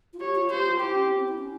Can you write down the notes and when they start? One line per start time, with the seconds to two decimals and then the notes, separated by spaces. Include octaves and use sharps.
0.13 F4
0.20 G4 C#5
0.35 F4
0.50 G4 C5
0.66 F4
0.80 E4 G4
0.94 C#4
1.09 C4
1.20 C4
1.28 E4
1.38 C#4